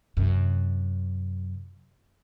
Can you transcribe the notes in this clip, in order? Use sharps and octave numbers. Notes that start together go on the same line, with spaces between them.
F#2 C3